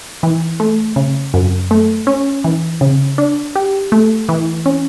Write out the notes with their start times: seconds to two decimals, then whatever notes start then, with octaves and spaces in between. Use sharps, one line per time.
0.23 E3
0.60 A3
0.96 C#3
1.34 F#2
1.71 A3
2.07 C#4
2.44 E3
2.81 C#3
3.18 D4
3.55 G4
3.92 A3
4.29 E3
4.66 C#4